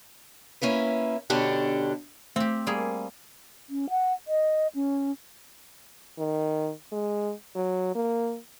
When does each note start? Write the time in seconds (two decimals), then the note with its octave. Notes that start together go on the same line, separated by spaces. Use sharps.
0.62 A#3 C#4 E4 B4
1.30 B2 D3 C#4 D4 G4
2.36 A3 C4 G4
2.67 G3 A#3 G#4
3.70 C#4
3.90 F#5
4.28 D#5
4.75 C#4
6.18 D#3
6.92 G#3
7.55 F#3
7.95 A#3